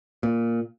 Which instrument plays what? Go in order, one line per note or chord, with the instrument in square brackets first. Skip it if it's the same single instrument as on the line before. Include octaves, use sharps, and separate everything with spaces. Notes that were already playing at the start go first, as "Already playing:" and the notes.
[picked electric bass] A#2